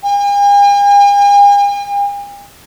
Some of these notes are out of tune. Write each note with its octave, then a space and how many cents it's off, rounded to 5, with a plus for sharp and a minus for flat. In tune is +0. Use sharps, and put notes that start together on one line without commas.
G#5 -45